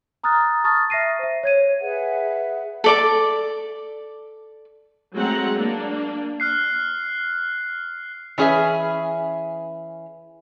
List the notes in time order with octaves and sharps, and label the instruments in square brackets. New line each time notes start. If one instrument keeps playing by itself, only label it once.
[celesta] A#5 D#6 F6 F#6 A6
A5 C#6 D#6 F6 A6
E5 A6 A#6 C7 D#7
C5 E5
C#5 G#6 D#7
[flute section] G#4 B4 E5 F#5
[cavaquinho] A4 D5 D6
[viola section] F#3 G#3 A3 C4 F#5 A#5
A#3 D4
[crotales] F6 F#6 C7
[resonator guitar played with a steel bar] E3 C#4 G#4 B4 E5